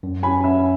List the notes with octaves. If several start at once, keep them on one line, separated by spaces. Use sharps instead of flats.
F#2
C#4 G#5 B5
C#4 E5